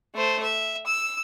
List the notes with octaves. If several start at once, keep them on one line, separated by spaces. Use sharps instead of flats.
A3 C5
E5
E6